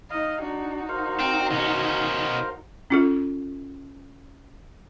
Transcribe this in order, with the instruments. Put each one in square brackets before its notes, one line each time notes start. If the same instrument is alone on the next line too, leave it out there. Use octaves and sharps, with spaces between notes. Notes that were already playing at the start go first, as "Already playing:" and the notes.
[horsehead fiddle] D#4 D#5 [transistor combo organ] F5
[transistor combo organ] D4 [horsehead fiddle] D#4 F#4
[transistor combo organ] A#4 C5 F5
[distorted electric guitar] C4
B2 C#4
[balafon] C#4 F4 A4